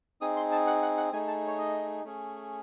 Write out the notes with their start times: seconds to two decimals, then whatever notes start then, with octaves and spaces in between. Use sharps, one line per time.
0.21 C4 D#4 G#4 D#6
0.37 C6
0.52 A5
0.67 F#5
0.82 F#5
0.97 F#5
1.13 A3 D#4 G#4 G#5
1.28 A5
1.47 C#5
1.58 D#5
2.04 A3 C#4 G#4